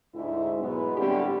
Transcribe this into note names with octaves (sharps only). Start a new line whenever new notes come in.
D2 G#2 E4
B2 F#3 G#3 B3
A2 D3 G3 C4 C#4 G4